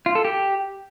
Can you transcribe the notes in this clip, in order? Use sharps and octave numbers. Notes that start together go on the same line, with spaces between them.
F4
A4
G4